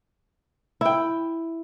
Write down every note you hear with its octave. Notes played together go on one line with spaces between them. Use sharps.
E4 G5